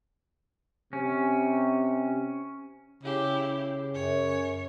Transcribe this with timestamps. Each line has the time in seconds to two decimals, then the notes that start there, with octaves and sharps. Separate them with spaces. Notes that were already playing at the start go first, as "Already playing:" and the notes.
0.93 C3 C#4
3.04 C#3 E4 G4
3.95 F#2 C#5